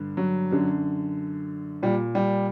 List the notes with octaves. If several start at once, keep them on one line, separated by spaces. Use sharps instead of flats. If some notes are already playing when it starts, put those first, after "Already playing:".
Already playing: G2 D3
F#3
F#2 D3
A#2 G3
G3